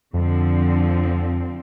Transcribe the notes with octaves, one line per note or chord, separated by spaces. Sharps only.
F2 D3 F3 C4